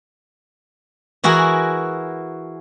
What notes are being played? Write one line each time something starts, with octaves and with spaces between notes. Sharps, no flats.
E3 E4 F#4 G#4 A#4